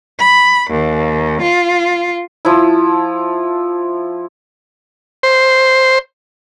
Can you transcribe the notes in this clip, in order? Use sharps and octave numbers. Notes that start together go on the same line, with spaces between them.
B5
D#2
F4
F3 E4
C5